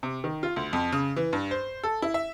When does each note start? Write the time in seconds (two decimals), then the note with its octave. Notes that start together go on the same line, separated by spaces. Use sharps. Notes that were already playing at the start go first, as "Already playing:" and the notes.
0.03 C3
0.24 D#3
0.43 F4
0.56 D2
0.73 F2
0.92 C#3
1.16 E3
1.33 G2
1.51 C5
1.84 A4
2.02 E4
2.14 E5